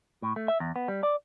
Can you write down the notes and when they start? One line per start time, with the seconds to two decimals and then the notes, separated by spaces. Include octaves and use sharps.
0.22 A2
0.36 A3
0.48 E5
0.60 E2
0.76 B3
0.88 G3
1.03 D5